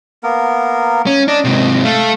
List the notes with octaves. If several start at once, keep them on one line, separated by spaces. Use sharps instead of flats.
A#3 B3 A#4
C#4
D4 D#5
G#2 C3
A3 F5